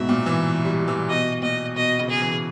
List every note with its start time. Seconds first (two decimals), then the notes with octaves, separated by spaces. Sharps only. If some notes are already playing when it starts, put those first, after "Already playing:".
Already playing: G#2 B2 E5
0.09 A#2
0.26 E3
0.65 G3
0.88 E3
1.09 B2 D#5
1.42 A#2 D#5
1.76 B2 D#5
1.99 C#3
2.10 G#4
2.21 E3